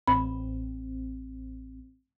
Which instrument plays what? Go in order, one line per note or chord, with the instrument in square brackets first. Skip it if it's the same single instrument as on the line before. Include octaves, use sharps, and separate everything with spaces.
[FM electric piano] A1 C4 [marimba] B5